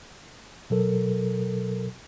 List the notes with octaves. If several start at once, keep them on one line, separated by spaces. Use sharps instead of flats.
B2 F#3 A4 A#4